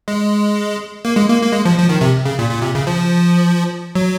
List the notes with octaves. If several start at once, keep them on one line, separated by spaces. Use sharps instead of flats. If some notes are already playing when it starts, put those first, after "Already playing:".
G#3
A#3
G#3
A#3
A#3
G#3
F3
F3
D#3
C3
C#3
A#2
A#2
C3
C#3
F3
F#3